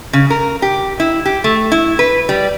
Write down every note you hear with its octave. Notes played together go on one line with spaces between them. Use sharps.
C#3
A#4
G4
E4
G4
A3
E4
B4
G3